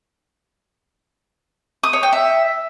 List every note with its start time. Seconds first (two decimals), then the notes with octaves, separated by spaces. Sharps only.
1.83 D#6
1.93 C#5
2.03 G5
2.13 E5